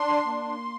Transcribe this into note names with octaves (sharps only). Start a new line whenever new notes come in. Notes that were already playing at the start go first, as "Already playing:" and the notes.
Already playing: D4 C6
A#3